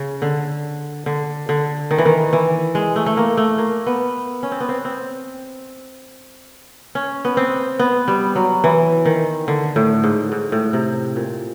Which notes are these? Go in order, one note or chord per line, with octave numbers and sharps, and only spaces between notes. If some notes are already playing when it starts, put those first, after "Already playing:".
Already playing: C#3
D3
D3
D3
D#3
E3
D#3
E3
G#3
A3
A3
A#3
A3
A#3
B3
C#4
C4
B3
C4
C4
C#4
B3
C4
B3
G3
F#3
E3
D#3
D3
A2
G#2
G#2
A2
C3
A#2